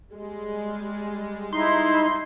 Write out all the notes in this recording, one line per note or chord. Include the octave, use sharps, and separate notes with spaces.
G3 G#3
D#4 E4 C6